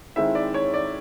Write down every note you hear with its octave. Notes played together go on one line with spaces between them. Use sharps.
D#3 G#3 C4 E4 E5
D5
C#5
D5